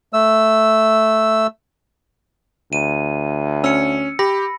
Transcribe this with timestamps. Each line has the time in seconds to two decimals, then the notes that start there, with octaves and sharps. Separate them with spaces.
0.13 A3 E6
2.73 D2 D#7
3.64 C#4 E6 C#7
4.19 G4 B5 A#6